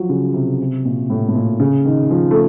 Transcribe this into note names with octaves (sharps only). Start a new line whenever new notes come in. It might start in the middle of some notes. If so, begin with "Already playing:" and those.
Already playing: F3 F#3
C#3
C3
C3
A#2
A2
A2
A#2
C#3
D#3
F3
A3